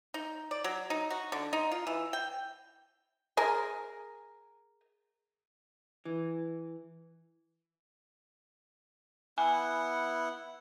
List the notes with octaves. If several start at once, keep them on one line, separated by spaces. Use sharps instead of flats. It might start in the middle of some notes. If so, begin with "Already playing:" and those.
D#4
D5
F#3
D#4
F#4
D3
D#4
F4
E3
G5
G#4 A#4
E3
B3 E4 F#5 G#5